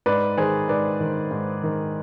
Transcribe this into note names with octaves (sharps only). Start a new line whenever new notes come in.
G#2 B4 D5
D#3 G#4 C5
G#2 B4 D5
D#3
G#2
D#3